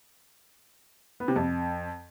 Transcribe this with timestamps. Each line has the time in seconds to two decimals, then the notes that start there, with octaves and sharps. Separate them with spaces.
1.20 B3
1.28 C3
1.36 F2